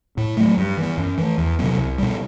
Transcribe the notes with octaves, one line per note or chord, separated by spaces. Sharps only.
A2
F#3 A3
G2
E3 B3
F#2
E3 A3
E2
C3 F#3 B3
C2
B2 G3